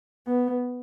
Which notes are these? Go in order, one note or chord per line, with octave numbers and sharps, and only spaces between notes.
B3